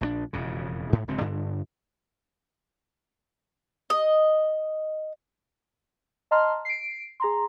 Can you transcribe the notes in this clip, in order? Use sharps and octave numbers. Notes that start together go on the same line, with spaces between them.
A#1 G#3 D4
E1 F2 C#3
G#2
D1 C#2 D3 C4
G2 D3
D#5
D#5 A5 A#5 C6 F6
C7 D7
G#4 A#5 C6